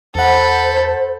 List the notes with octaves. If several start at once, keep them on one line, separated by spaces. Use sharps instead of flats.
E2 A4 C5 F#5 B5